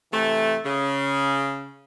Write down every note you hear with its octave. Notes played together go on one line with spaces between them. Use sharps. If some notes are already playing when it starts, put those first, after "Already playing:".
C3 E3 A3
C#3